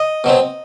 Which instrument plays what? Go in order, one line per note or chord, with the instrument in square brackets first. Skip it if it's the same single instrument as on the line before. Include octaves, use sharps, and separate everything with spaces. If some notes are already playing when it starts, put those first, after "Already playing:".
Already playing: [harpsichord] D#5
B2 F#3 C4